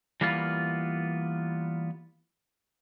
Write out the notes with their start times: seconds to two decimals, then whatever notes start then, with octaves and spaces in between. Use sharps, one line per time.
0.21 E3 G3 A#3 B3 F4